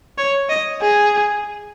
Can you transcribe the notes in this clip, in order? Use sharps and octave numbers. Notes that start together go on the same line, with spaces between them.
C#5
D#5
G#4